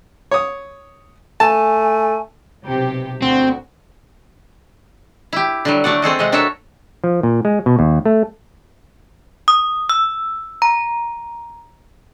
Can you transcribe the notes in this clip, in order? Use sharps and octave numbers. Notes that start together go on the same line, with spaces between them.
C#5 D#6
A3 G#5 A5
B1 C3 G4
D2 C4 F#4
E4 G4
D3 F#3 G3
A3 D4 F#4 D5 F#5
C4 G#4 A4 D#5
C3 G#3 D#5 F#5
D4 F#4 A4 A#4 C#5 E5
F3
A#2
G#3
B2
D#2
A3
D#6
E6
A#5